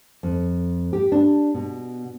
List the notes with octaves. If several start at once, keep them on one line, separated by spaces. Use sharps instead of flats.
F2
G4
D4
B2